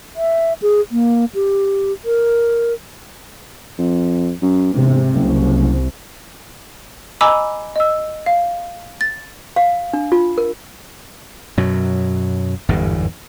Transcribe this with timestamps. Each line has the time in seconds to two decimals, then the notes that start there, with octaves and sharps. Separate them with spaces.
0.16 E5
0.62 G#4
0.91 A#3
1.35 G4
2.05 A#4
3.78 F2
4.41 F#2
4.73 E1 G#2 C3
5.13 F#1 C2
7.21 D#5 G#5 A#5 B5 D6 E6
7.76 D#5 E6
8.26 F5
9.01 A6
9.56 F5
9.93 D4
10.12 F4
10.38 A#4
11.57 F#2 B2 F#3
12.69 G1 E2 G#2